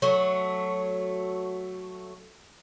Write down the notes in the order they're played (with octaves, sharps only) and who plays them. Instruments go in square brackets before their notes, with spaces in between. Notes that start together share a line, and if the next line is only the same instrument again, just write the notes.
[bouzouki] F#3 A3